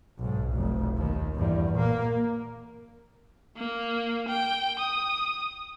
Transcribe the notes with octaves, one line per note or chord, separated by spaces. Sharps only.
B1 G#2
F1 B1
D#2
E2 G2
A#2 A#3
A#3
G5
D#6